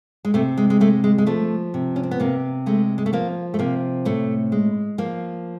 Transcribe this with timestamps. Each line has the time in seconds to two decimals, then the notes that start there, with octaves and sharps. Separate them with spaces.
0.25 G#3
0.34 C3 A3
0.57 G#3
0.70 G#3
0.80 G#3 A3
1.04 G#3
1.18 G#3
1.27 F3 A3
1.74 C3
1.96 C#4
2.03 C4
2.11 B3
2.20 C3 A#3
2.66 G#3 A3
2.98 G#3
3.06 A3
3.13 F3 A#3
3.54 A3
3.59 C3 A#3
4.05 A2 A3
4.52 G#3
4.98 F3 A#3